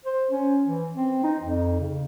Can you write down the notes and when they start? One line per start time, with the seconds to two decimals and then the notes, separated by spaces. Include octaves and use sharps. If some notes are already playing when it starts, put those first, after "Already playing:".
0.05 C5
0.31 C#4
0.66 E3
0.96 C4
1.24 D#4
1.43 F2
1.80 C#3